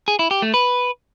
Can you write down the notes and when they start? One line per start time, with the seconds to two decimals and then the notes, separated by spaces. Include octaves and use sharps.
0.08 G#4
0.19 E4
0.31 G4
0.42 A3
0.54 B4